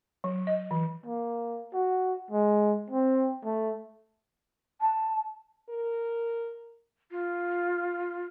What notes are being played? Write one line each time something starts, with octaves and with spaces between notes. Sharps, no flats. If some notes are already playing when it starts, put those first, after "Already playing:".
F#3
D#5
E3
A#3
F#4
G#3
C4
A3
A5
A#4
F4